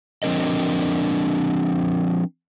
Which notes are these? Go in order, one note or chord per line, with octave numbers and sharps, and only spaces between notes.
F3 C4 D4 A#4 D#5